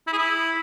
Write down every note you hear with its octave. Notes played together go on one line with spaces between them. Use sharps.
E4
G#4
E4